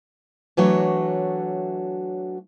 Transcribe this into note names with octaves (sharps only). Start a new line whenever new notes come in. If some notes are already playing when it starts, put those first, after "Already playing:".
E3 F#3 A3 D4 F#4 C#5